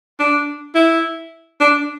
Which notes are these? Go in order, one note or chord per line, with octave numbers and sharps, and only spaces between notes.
D4
E4
D4